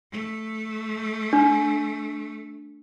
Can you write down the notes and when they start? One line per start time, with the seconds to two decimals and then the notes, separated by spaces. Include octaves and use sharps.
0.12 A3
1.33 D4